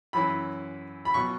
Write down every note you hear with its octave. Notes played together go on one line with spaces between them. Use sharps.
F#2 E3 C#4 E4 B5
B5
B2 F#3 C#6